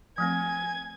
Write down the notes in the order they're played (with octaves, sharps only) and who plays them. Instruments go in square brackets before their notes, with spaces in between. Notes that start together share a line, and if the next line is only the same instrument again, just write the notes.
[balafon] F3 A3 C4 [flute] G#5 [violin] G#6